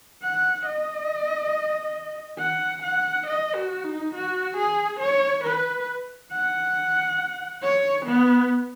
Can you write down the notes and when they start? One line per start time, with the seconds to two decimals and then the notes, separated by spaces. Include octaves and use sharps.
0.23 F#5
0.66 D#5
2.39 F#5
2.83 F#5
3.27 D#5
3.55 F#4
3.84 D#4
4.14 F#4
4.57 G#4
5.00 C#5
5.45 B4
6.32 F#5
7.62 C#5
8.06 B3